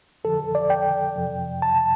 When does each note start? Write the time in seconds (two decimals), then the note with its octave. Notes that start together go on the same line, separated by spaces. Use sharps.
0.24 F2 D3 F3 A4
0.55 D5
0.70 G5
1.16 F2 C3 F3
1.62 A5